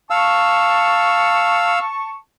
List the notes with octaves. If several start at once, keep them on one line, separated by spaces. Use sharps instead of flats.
F5 A5 C#6 E6